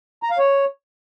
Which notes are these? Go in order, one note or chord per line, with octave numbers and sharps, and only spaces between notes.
A#5
F5
C#5